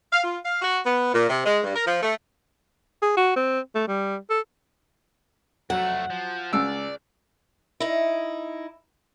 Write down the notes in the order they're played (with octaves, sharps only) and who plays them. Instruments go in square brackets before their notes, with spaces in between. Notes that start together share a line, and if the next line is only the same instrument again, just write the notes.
[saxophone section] F5
F4
F5
F#4
B3
A#2
C3
G#3
G2
A#4
F3
A3
[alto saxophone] G#4
F#4
C4
A3
G3
A4
[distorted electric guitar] F2 A3 [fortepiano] F#3 [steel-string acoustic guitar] F#5
[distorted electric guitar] F3
[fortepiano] C#2 E6 [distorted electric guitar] D5
[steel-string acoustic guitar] D#4 E4